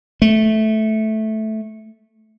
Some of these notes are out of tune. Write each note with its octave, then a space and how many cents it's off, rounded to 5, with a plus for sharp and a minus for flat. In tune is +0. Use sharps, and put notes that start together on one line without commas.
A3 -10